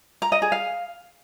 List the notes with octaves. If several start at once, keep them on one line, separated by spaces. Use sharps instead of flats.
A#5
D#5
G#4
F5